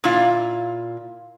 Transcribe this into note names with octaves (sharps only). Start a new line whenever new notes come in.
A#2 E4 F4